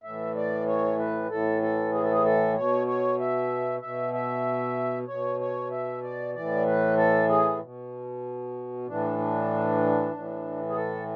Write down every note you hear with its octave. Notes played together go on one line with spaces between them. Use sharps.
A2 E5
E3
D5
C#5
B4
A2 E3 A4
A4
G#4
A4
G#4
A4
B2 C#5
C#5
E5
B2 E5
E5
B2 C#5
C#5
E5
D5
A2 E3 D5
B4
A4
G#4
B2
A2 E3 D4
D4
A2 E3
G#4
A4